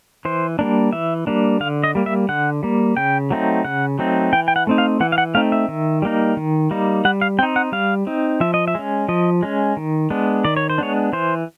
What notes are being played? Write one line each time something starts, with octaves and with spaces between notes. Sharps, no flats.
E3 C5
G3 A#3 D4
E3 E5
G3 A#3 D4
D3 F5
D#5
G3 A#3
E5
D3 F#5
G3 A#3
C#3 G5
F#3 A3 C4 D#4
C#3 F#5
F#3 A3 C4 D#4
E3 G5
G5
F#5
A3 C4 D#4
F5
E3 F#5
F5
F#5
A3 C4 D#4 F5
E5
D#3
G3 A#3 D#4
D#3
G3 A#3 D#4
G3 F#5
F5
C4 D#4 G5
F#5
G3 F5
C4 D#4
F3 E5
D#5
E5
G#3 C#4
F3 D#5
G#3 C#4
D#3
G#3 B3 D4
D#3 D5
C#5
C5
G#3 B3 D4 C#5
E3 C5